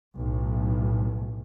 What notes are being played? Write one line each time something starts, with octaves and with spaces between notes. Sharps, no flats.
B1 A2